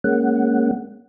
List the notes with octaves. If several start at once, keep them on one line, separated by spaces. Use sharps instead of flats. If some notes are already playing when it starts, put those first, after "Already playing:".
G#3 A#3 C#4 F#5